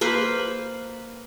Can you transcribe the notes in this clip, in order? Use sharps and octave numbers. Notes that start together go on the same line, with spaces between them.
A#3 B4 C5